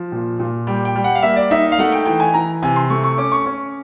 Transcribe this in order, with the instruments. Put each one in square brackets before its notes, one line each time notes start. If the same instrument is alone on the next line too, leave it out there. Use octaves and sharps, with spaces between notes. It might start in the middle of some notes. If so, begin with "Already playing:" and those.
Already playing: [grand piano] F3
A#2
A#2
G3 G5
G5
G3
F#5
F5
A#3 E5
D5
D#4 E5
F5
A3 F#5
G5
E3 G5
G#5
E3 A#5
C3 G#5
C6
A3 C#6
C#6
C#4 D6
C#6
C#4 C#6